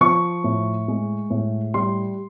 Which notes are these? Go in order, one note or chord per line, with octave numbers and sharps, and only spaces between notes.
F3 C#6
A2
G#3
A2
G3 C6